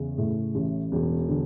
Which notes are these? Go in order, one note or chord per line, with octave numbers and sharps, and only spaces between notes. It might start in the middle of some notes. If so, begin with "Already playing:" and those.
Already playing: E2 C#3
A2
A1
E1
D3